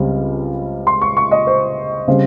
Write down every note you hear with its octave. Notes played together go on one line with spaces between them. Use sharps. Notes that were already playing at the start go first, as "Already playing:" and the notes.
Already playing: C#2 C#3 G3 C4
C6
C#6
C#6
D#5
C5
C#3 G3 C4